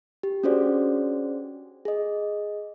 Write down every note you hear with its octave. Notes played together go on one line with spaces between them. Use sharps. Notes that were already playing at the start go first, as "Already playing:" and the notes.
G4
C#4 D4 F#4 G#4 C5 D5
G#4 D#5